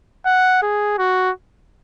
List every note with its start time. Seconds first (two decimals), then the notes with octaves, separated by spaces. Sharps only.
0.26 F#5
0.62 G#4
0.98 F#4